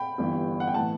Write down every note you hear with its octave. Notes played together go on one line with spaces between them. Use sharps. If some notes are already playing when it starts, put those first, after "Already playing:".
Already playing: G5 B5
G1 G2 E3
F#5
G5
A2 E3 F#5 A5